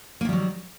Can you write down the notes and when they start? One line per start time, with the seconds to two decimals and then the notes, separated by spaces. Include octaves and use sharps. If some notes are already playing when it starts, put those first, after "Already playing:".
0.21 A#3
0.25 D#3
0.29 G3
0.33 F#3